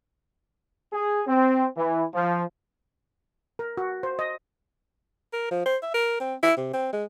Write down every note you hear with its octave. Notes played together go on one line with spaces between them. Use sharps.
G#4
C4
E3
F3
A#4
F#4
C5
D#5
A#4
F3
C5
E5
A#4
C4
E4
C3
C4
G#3